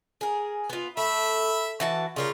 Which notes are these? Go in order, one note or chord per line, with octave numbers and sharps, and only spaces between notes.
G#4 A#4
B3 F4
A3 E5 B5
E3 F#4 A5
C#3 G3 F4 A#4